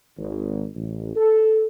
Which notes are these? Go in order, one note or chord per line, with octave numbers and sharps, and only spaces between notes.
G#1
A1
A4